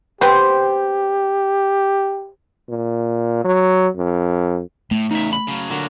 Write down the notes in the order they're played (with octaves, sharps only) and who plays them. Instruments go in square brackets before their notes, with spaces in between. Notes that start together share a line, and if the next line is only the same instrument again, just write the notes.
[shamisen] B3 C4 [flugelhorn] G4 [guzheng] C5
[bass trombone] A#2
F#3
F2
[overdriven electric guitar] A2 [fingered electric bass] A3
[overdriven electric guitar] E2 C#3 [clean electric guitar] D#4 E5
[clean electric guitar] B5
[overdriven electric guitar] C#3 F#3
[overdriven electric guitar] A#2 F#3 [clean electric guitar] D3 F#4 A#4